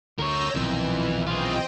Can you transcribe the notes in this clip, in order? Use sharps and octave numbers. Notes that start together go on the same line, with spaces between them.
D2 D3 A#4 C#5 E6 G6 A#6
B1 F2 A#2 D#3 E3
C4 F4 G#4 D#5 G5